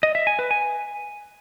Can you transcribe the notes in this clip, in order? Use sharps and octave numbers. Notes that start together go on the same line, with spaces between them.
D#5
E5
G#5
B4
G#5